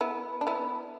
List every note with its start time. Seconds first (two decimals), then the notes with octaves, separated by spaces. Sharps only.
0.01 B3 E4
0.41 D4
0.47 B3 E4